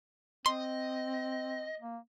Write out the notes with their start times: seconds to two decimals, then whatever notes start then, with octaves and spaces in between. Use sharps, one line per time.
0.46 C4 D#5 C6
1.80 A#3